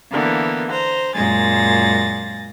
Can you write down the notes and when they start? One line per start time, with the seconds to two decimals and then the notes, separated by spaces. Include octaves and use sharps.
0.11 D3 E3 A#3 B3
0.69 C5 A#5
1.14 F#2 A#2 G#3 G#4 A6 A#6